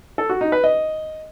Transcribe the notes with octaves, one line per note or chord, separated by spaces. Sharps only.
A4
F#4
D#4
B4
D#5